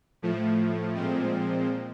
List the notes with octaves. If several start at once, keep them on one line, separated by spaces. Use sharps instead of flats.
A2 F3 A3
A#2 F3 G#3 C4